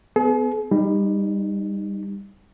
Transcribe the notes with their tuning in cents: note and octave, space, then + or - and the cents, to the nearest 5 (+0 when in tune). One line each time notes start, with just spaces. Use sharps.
B3 +25 G#4 +45
G3 +20 D#4 -10